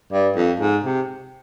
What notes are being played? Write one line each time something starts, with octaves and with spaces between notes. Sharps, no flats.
G2
F2
G#2
C3